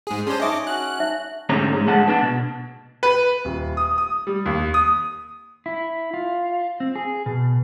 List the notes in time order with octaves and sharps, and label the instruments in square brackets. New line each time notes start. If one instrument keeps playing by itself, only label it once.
[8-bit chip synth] G#2 G#4
[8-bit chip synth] C#4 C5 [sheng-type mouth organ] D4 C6 [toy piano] G#4
[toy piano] D#4 E5 G#5 [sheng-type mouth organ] C#5 [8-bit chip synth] D#5 D6
[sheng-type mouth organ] C#4 F#4 [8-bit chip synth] F#6
[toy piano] D#4 E5
[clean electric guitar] D2 G#2 D3 C#4 A#5
G#2 G#3
G#2 D3 G#3 G#4 F#5 A5
B3 D4 A5
B2
[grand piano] B4
D#1
D#6
D#6
G3
D#2
D#6
[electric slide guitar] E4
F4
C4
G#4
B2